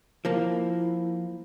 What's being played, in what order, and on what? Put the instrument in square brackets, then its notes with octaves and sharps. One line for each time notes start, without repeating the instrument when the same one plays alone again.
[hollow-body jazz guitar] F3 A#3 [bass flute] E4